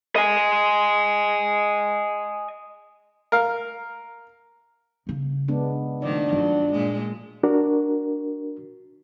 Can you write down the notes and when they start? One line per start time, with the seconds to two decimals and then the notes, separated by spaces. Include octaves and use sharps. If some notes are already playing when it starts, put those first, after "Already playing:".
0.16 D#5 G#5
3.32 A#4 F5
5.07 G1 C#3
5.48 G#3 B3 D4
6.02 A2 D#3 F3 D4 D5
6.33 G2 F3 F#3 F4
6.72 A#2 G#3
7.43 D4 F#4 A#4